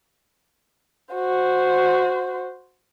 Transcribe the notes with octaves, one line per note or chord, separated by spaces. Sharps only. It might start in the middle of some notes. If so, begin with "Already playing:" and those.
F#4 C5